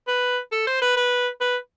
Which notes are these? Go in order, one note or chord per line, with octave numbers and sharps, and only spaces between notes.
B4
A4
C5
B4
B4
B4